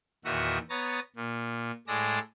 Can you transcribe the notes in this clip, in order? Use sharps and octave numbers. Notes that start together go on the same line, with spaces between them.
E2 A#2 D#3 F#4 E5 D#6
B3 C#5 A#5 D#6 A6
A#2
A2 G#3 D5 E6 A#6